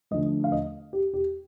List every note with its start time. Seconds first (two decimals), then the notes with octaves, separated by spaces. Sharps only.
0.11 D3 F3 A3 D#5
0.44 F5
0.52 D#5
0.93 G4
1.14 G4